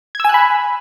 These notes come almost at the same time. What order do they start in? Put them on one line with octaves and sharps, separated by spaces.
G#6 E6 G#5 F#6 B5